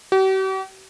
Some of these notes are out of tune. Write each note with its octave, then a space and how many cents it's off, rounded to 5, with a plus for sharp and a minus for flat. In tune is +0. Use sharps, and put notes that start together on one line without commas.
G4 -45